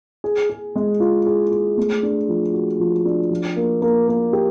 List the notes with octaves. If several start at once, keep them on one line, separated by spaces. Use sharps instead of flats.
G#4
G#4
G#3
F4
G#4
G#4
A3
D4
F3
F#4
F3
D4
F3
A#3
A#3
A#3
G4